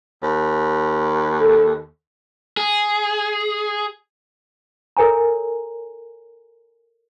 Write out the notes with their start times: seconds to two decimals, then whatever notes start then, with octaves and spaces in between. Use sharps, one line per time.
0.23 D#2
1.41 A4
2.57 G#4
4.97 A4 A#4 C#5 G#5 A#5